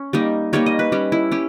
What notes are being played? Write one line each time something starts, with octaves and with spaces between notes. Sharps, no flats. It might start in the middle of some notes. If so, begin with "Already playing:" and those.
Already playing: C#4
G3 A#3 D#4
G3 A#3 D#4 C#5
D#5
B4
G3 C#4
E4
C#4 G4